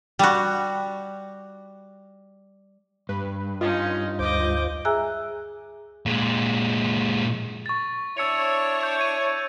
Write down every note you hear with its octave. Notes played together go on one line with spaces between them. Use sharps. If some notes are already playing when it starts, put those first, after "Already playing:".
G3 F#4
G2 B4
C#4 D#4 F4 D#5
D2 C5 D#5 D6 G6
G#4 E5 G#5 A#5 E6 F#6
A#2 G#3
C#6 A6
D4 E4 C#5 E6 C#7 F7
G6
G#6 D#7